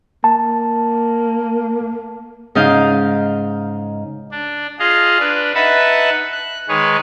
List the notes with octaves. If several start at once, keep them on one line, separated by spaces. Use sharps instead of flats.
A#3 A5
G#2 C#3 D#4 D#5 F5 G6
D4
F4 G#4 D#5 F5
D4 B4
D#4 B4 E5 F#5 A5 B5
F#6
D#3 G#3 G#4 B4 C#5